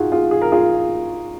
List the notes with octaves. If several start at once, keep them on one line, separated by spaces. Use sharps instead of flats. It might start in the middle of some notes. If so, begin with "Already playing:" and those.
Already playing: D#4 F4 F#4 G#4
F4 G#4
G#4
A#4
F4 G#4